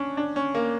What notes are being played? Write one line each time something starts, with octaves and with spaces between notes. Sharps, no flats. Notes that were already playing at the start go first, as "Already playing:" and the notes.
Already playing: C#4 D4
D4
C#4
A#3